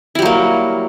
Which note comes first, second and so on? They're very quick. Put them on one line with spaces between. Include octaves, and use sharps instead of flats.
E4 G3 F#3 A#3